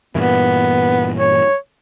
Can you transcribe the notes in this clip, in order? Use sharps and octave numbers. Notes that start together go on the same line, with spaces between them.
G2 A#2 E3 B3
C#5